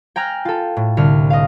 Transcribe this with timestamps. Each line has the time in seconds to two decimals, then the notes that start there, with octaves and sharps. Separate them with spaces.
0.16 G5 G#5 A#5 F6 F#6
0.45 F4 A4
0.77 A2
0.97 C2 D3 F6
1.30 D#5 F5